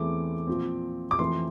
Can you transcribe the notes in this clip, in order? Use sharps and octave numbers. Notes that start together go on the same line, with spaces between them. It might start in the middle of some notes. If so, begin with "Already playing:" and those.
Already playing: E2 E3 A3 C4 D6
A#2 F3 C4
D6
F2 E3 A3 C4 C6